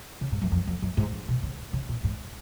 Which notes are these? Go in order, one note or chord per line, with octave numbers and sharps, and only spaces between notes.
C#3
G#2
F#2
F2
F2
F#2
G#2
B2
C#3
C#3
A#2
G#2